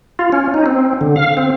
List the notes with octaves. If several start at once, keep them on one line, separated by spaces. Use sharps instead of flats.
F4
C#4
D#4
C4
D3
F5
C4